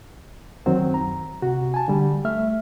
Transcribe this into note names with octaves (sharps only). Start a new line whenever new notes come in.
F#2 D#3 F#3 C4 C5
A#5
C3 F#4
G#5 A5
D3 G3
A3 E5 F6